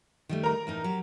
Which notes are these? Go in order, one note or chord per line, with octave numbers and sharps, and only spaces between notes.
D#3 G3 A3
A#4 A#5
E2 A2 D#4
F#3 G4